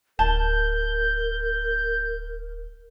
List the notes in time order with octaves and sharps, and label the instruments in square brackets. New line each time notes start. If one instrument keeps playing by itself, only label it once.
[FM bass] D1 [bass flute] A#4 [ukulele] A5 [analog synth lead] G6